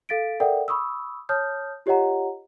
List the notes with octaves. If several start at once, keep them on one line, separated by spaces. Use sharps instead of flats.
A4 F5 A6 B6 D7
A4 A#4 D5 E5 F#5 G5
B5 C#6 D#6 E6
C#5 A5 D#6 F6 G6
F4 G4 C#5 D#5 F#5 A#5